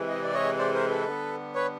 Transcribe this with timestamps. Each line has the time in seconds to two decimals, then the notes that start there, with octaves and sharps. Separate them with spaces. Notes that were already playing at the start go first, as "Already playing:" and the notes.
Already playing: C3 E3 G#3
0.09 D#5
0.22 D5
0.34 C#5 D#5
0.58 C5 D5
0.74 A#4 C5
0.90 A4 B4
1.07 D3 G3 B3
1.55 B4 C#5